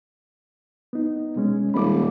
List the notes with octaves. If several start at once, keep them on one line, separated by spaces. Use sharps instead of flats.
B3 D#4
B2 G#3 C#4
D#1 B5 D6